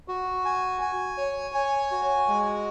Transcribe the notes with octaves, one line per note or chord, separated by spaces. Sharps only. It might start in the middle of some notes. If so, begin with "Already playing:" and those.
F#4
G#5
G#5
C#5
G#5
F#4
G#3